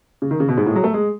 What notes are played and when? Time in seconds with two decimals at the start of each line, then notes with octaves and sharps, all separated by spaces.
0.22 C#3
0.31 D#3
0.40 C#3
0.49 B2
0.57 G#2
0.66 A2
0.71 G#3
0.76 F#3
0.84 A3
0.94 G#3